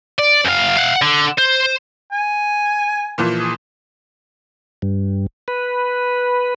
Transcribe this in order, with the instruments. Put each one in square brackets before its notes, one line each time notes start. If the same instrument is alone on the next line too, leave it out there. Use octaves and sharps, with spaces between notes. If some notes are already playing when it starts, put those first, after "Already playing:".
[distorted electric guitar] D5
F#2 F5
F5 F#5
D3
C5
[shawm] G#5
[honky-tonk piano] A#2 E3 F3
[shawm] G#4
[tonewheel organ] G2
B4